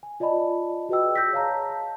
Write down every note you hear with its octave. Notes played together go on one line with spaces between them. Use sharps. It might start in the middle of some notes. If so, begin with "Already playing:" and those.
G#5
F4 D5 D#5 A5 B5
F#4 G#4 B4 D#5 G5 E6
G#4 E6 G6 A#6 B6
C#5 F5 A5 A#5
A5